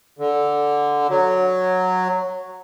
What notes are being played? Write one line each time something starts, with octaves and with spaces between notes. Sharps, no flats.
D3
F#3